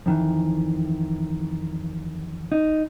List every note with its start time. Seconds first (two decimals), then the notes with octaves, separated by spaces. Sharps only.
0.06 F2 D#3 E3
2.52 D#4